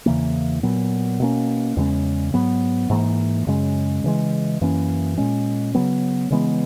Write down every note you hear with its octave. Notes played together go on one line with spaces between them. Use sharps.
E2 C#3 E3 A#3
A#2 F#3 B3
B2 A#3 C#4
E2 C#3 G#3 C#4
G#2 F#3 B3
G#2 E3 A#3
F#2 C#3 G#3 C#4
C#3 E3 G#3
F#2 E3 A#3 C#4
A#2 G#3 C#4
C#3 F#3 B3
C#3 E3 G#3 B3